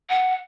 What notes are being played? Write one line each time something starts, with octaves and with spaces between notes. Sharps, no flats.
F#5